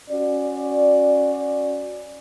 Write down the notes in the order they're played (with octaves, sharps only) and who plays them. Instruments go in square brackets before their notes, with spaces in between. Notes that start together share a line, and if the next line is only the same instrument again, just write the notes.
[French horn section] C#4 F#4 D5